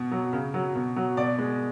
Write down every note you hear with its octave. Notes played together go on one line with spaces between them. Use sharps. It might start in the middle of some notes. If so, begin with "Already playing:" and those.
Already playing: B2
F#3
C#3
F#3
B2
F#3
B2 D5
G#3